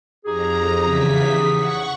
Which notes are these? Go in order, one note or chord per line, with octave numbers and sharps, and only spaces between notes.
F2 D#4 G4 G#4 A#5
E2 C#3 B6
F#5 C#6